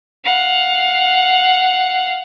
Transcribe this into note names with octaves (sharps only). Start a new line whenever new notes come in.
F5 F#5